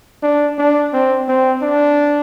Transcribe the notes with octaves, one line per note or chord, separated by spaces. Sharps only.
D4
D4
C4
C4
D4